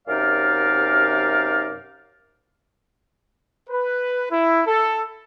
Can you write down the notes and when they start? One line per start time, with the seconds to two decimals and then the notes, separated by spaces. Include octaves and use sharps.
0.08 F#2 C3 D#4 A#4 D5 F5
3.68 B4
4.30 E4
4.66 A4